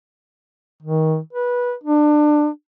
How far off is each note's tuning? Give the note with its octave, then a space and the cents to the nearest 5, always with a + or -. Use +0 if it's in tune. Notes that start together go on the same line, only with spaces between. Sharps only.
D#3 +25
B4 -15
D4 +25